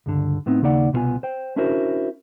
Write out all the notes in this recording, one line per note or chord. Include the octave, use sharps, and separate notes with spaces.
C#2 G2 D3
A2 B3 C4 D#4
D#2 C#3 A#3 D#4 D5 F#5
C2 B2 E3 B3 F4 G#5
C5 G5
C#4 D4 E4 F#4 A#4 C5